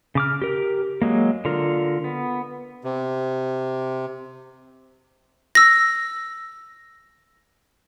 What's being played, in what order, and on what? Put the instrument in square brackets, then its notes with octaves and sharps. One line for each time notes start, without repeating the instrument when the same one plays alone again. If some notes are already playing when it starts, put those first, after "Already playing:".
[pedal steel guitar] C#3 D6 F6
G4 A#4
F#3 G#3 A#3
D3 F4 A#4
B3
[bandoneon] C3
[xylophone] E6 A#6